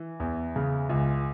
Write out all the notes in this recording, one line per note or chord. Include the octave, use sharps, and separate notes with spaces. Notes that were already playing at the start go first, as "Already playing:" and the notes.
Already playing: E3
E2
C#3
C#2